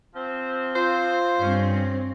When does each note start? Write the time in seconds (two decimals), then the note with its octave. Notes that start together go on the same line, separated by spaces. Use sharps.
0.15 F3 C4
0.75 F4 C5
1.42 G2 C4 C#4